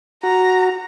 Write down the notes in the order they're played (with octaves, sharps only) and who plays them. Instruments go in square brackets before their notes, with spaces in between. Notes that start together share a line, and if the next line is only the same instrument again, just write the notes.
[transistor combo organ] F#4 [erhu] A#5